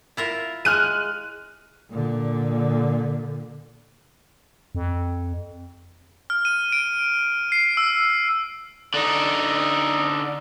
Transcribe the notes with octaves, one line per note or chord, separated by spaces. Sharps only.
E4 F4 A#4
G#3 F6 F#6 D#7
A#2 D3
F2
F6
D#7
D7
C7
E6
D3 D#4